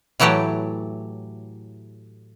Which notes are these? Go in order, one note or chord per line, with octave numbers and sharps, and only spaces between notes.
A2 E3 F#3 A3 G4